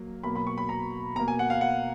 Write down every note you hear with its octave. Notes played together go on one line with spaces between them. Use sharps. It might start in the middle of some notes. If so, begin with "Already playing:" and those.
Already playing: F#3 A#3
B2 F#3 A#3 B5
B5
C#6
B5
A#5
B2 A#3 A#5
G#5
F#5
F5
F#5